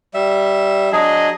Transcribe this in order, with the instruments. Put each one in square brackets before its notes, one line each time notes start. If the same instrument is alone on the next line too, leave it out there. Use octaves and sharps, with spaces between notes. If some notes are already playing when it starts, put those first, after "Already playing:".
[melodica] G3 E5
[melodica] F#3 D4 G#4 [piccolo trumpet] D#5